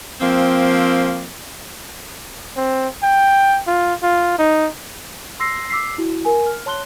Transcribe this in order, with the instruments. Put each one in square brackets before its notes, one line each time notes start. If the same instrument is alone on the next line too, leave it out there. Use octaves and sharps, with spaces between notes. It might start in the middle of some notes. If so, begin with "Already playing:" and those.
[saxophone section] F3 A#3 C4
[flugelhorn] C4
G5
F4
F4
D#4
[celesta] C6 E6 A#6 C7
D6 E6 B6 C7
E4 F#4
A#4 G#5
F6
C#5 A5 C6 F#6 G7